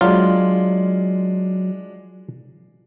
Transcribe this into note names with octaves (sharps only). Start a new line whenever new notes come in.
F#3 G#3 D4 F4